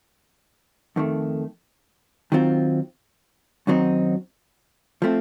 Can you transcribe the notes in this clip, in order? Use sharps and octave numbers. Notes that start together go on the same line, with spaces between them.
F2 D#3 A3
D#3 F#3 C4 F4
F#2 D#3 F#3 C4 D#4
F3 A3 C4